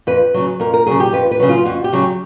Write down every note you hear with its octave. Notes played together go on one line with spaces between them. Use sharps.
F2 B4
C#3 F#3
F2 A#4
A#4
C#3 F#3 G#4
G4
F2 B4
B4
C#3 F#3
F4
F2 F#4
G4
C#3 F#3